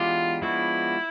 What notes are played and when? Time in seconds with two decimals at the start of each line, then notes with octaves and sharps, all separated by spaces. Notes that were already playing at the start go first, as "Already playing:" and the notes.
Already playing: E3 G#3 B3 D4 F4 G4
0.42 F3 G#3 B3 D4 E4 F#4